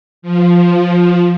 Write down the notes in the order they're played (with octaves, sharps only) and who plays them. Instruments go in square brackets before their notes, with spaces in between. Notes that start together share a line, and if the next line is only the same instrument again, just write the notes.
[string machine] F3